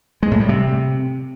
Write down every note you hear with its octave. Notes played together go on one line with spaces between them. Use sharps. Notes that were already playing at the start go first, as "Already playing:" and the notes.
G#3
A2
G3
C3